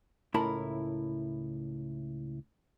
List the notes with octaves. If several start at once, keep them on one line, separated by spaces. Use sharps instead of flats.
C#2 A2 E4 A#4 A5 B5